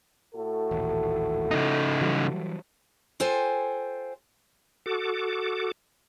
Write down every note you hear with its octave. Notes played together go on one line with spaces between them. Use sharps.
A2 F#4 A4
D#1 A1
C#3 D#4
E3 F#3 G3
F4 A4 C5 G5 G#5
F#4 A4 D6